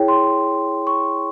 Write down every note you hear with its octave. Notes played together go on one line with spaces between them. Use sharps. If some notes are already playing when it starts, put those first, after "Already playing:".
Already playing: E4 G#4 C#5 G5
C6
C#6